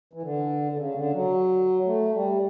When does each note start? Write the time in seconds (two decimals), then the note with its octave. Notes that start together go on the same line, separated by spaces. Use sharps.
0.13 E3
0.22 D3
0.72 D3
0.77 C#3
0.95 D3
1.14 F#3
1.86 A3
2.14 G3